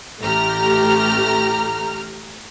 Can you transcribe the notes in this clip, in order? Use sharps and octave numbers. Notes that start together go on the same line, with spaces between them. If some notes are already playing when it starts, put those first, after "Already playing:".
A1 A3 G4 A#5 F6